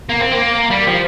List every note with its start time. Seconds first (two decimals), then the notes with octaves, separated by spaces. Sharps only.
0.09 A#3
0.20 C4
0.31 A#3
0.70 G3
0.87 F3